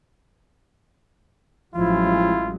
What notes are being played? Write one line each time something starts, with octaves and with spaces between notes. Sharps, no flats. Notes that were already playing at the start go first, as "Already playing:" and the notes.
A1 F3 F#3 G#3 E4 F4